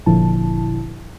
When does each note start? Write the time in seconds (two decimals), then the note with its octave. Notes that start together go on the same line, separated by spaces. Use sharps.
0.06 G1 A#2 D3 F3 E4 A5